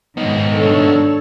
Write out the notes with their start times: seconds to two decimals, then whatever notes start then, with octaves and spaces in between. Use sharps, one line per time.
0.17 G#2 D#3 B3 D#4
0.52 D4 A4 C#5